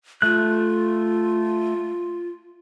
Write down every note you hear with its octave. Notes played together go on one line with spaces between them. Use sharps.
A3 F4 F#6